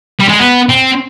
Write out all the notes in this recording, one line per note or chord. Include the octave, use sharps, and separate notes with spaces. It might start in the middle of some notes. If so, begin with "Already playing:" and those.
G3
G#3
B3
C4